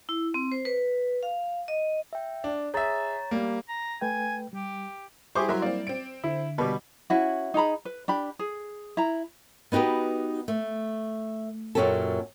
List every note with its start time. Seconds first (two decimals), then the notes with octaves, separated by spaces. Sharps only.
0.09 E4
0.34 C4
0.52 C5
0.65 B4
1.23 F5
1.68 D#5
2.13 E5 G5
2.44 D4
2.74 G#4 C#5 E5 A#5 A6
3.31 G3 A#3
3.69 A#5
4.01 A3 B4 G5 G#5
4.53 G3 G4
5.35 G3 E4 G4 G#4 C5 C#6 D6
5.49 F#3 A#4 E5 C6
5.62 A#3 C4 D5
5.87 C4 D7
6.24 D3 E4
6.58 B2 G3 B4
7.10 C#4 E4 F#4
7.54 D#4 G#4 A#5 B5
7.85 B4
8.08 D4 G4 B5
8.39 G#4
8.97 E4 A#5
9.72 B3 D#4 F#4 G4 B4
10.48 A3
11.75 F#2 A#2 F#3 C#4 G4 A4